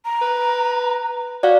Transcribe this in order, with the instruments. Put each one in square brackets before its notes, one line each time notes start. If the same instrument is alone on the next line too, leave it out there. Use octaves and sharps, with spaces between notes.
[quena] A#5
[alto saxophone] B4
[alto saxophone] F#4 [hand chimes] D5 F5